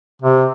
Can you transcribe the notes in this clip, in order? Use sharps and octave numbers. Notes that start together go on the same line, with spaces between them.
C3